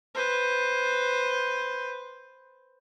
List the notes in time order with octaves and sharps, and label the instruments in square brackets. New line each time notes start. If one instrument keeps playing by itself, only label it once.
[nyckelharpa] B4 C5